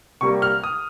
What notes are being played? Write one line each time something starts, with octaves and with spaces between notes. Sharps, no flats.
C3 G3 A#3 C#6
F6
D#6